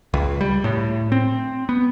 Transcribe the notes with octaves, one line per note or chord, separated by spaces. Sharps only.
C#2
G3
A2
C4
B3